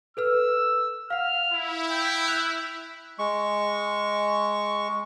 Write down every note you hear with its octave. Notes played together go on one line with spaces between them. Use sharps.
A4 B4 E6 F6
F5 F#5 F6
E4
G5
F#6 G6 E7 F7
G#3 C#6